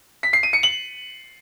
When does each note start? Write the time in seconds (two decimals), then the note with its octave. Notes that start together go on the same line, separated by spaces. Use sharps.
0.23 B6
0.33 C7
0.43 D#7
0.53 C#7
0.63 F#7